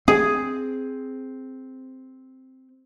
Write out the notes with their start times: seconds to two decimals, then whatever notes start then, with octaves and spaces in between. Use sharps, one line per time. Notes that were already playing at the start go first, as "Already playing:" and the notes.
0.08 C4 G#4